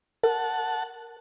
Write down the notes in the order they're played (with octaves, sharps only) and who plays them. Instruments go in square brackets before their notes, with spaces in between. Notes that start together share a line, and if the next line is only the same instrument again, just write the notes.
[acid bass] A#4 [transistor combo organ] F#5 A5